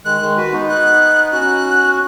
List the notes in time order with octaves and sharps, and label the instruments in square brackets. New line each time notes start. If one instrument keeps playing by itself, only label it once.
[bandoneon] D#3 G#3 [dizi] F#6
[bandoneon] D#3 G#3
F#4 B4
B3 D#4
[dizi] F#6
[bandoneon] C#4 F#4 [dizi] F#6